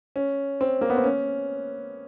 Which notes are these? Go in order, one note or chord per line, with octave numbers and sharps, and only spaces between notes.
C#4
C4
A#3
B3
C4
C#4